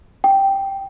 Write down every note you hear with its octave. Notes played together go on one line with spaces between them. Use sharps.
G5